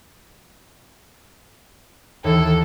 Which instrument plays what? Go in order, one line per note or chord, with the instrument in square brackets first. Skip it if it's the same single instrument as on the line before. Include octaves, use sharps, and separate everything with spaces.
[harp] D#2 E3 A5 [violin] A4